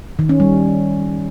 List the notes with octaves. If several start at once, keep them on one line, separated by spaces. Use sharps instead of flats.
D#3
C#4
G3